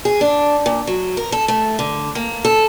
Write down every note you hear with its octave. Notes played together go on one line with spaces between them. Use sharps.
G#4
D4
A#2
F#3
A#4
A4
A3
D3
A#3
A4